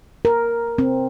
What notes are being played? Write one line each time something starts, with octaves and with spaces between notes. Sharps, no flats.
A#4
C4